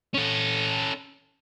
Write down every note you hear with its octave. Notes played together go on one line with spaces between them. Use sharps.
C#4 A4